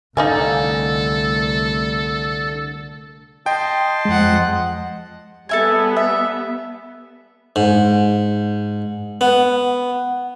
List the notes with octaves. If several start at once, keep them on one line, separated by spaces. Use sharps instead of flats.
C2 D3 A3 D#4 A4 F5 G#5
D#5 G5 A5 C6
F2 G#3 F#5
G3 B3 A4 E5 G#5
E5
G#2
B3